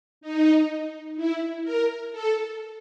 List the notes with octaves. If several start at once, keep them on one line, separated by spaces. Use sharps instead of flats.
D#4
E4
A#4
A4